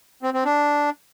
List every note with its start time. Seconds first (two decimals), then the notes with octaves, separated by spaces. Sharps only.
0.23 C4
0.34 C4
0.45 D4